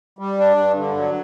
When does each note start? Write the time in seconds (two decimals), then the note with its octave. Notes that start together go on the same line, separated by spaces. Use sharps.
0.19 G3
0.38 D4
0.58 G2
0.76 D3
0.97 F#3